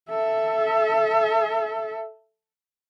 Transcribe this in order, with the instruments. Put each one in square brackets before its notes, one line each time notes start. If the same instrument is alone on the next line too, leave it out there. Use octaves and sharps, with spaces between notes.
[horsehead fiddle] A4 E5